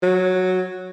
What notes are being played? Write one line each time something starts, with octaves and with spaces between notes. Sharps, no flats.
F#3